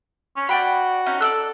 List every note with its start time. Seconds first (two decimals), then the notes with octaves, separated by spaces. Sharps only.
0.37 C#4
0.49 F#4 D5 G5 B5
1.06 C#4 D#4
1.21 A4 D5 E6 F#6